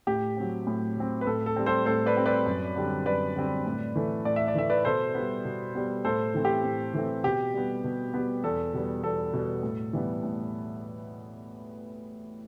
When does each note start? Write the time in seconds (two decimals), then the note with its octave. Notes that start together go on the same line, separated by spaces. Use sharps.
0.07 A2 G4
0.37 F#3 C4
0.67 A2
0.97 F#3 C4
1.21 B4
1.27 A2 A4
1.46 A4
1.56 G3 C4
1.66 A4 C5
1.86 A2 A4 C5
2.06 B4 D5
2.16 G3 C4
2.26 B4 D5
2.46 F#2
2.76 D3 G3 C4
3.06 F#2 B4 D5
3.36 D3 G3 C4
3.66 A2
3.96 E3 A3
4.25 A2 D5
4.36 E5
4.48 D5
4.55 E3 A3 E5
4.70 B4 D5
4.85 B2 A4 C5
5.15 G3 B3
5.45 B2
5.75 G3 B3
6.05 A2 A4 C5
6.34 E3 A3 C4
6.45 G4
6.64 A2
6.94 E3 A3 C4
7.24 B2 G4
7.54 G3 B3
7.84 B2
8.14 G3 B3
8.44 E2 A4
8.74 B2 G3 B3
9.03 E2 A4
9.33 B2 G3 B3
9.63 A2
9.93 E3 G3 B3
10.23 A2